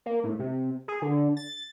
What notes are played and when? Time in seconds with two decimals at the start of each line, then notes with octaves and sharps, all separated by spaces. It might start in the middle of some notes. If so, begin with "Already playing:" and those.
0.06 A#3
0.24 A2
0.39 C3
0.88 G#4
1.02 D3
1.37 A6